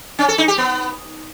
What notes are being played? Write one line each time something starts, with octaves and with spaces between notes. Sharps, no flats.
C#4
A4
D#4
G4
B3